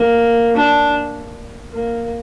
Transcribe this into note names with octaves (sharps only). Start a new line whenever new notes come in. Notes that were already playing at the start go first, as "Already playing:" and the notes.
Already playing: A#3
D4
A#3